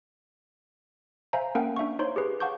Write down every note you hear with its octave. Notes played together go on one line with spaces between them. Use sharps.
C5 E5 F5 G#5 A#5
A#3 C#4 A#4 E5 F#5 G5
D4 E5 F5 C#6
D#4 C5 C#5 C6
G4 G#4 B4
F5 F#5 A5 C#6 D6 G6